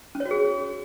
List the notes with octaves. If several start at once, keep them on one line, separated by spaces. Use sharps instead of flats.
C#4
C#5
F#4
G#4